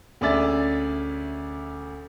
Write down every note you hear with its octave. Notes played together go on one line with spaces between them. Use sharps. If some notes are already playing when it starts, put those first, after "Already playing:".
D2 C#4 G#4 D5 E5 A6